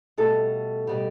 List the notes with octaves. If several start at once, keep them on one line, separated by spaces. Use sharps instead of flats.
B2 G3 A3 A4
B2 G3